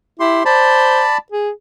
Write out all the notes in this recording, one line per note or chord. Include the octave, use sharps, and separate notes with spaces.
E4 G4 C6
C5 D5 A5 B5
G#4